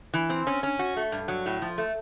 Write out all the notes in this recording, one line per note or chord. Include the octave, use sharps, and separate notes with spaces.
E3
C4
C#4
C#4
F#4
A3
G2
F#3
A2
F3
A3